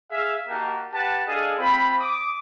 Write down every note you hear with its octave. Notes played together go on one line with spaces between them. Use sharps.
G#4 E5 F5
A#3 D#4 F#4 G4 F#5 A5
G4 B4 F#5 A5
D4 G#4 A4 D#5 F5
C4 F4 B5
D6 D#6